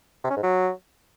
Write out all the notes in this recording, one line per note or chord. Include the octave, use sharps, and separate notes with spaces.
C3
C#4
G#2
F#3